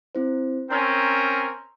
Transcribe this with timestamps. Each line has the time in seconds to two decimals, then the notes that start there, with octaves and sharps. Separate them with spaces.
0.15 C4 E4 C5
0.71 C4 C#4 A#4 A#5 C6 E6